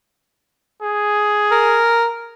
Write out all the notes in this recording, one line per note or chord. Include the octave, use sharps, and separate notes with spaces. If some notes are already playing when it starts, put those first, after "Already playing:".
G#4
A#4